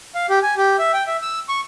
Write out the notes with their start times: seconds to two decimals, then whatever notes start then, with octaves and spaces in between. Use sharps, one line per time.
0.15 F5
0.30 G4
0.43 G#5
0.57 G4
0.79 E5
0.93 G5
1.07 E5
1.22 E6
1.49 C#6